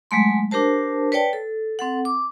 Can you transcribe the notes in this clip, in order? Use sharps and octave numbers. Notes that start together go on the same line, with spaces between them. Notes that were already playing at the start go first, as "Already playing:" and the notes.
F#3 G#3 A3 C6
D4 G4 A#4 C5 A5
B4 C#5 D5 G5 A5
A4
C4 A4 F#5
D6